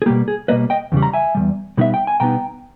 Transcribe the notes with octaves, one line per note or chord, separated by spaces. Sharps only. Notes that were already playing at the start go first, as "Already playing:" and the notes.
G#4
B2 G3 A#3 G4
G#4
B2 G3 A#3 B4 D#5
D#5 G5
E2 C#3 G3
A#5
E5 G#5
E2 C#3 G3
B2 G3 B3 D#4 E5
G5
G#5
B2 G3 B3 D#4 G5 A#5